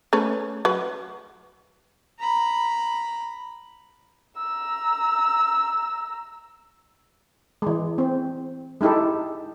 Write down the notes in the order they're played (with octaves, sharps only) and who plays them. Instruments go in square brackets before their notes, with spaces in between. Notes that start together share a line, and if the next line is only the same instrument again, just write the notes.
[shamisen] A3 C#4 B4
F#3 B4
[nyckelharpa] A#5 B5
[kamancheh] A#5 E6
[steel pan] E3 G#3
C4
G#3 D#4 E4 G4 A4